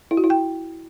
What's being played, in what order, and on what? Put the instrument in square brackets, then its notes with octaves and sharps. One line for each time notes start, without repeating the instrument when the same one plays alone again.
[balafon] E4
F#4
E4
G5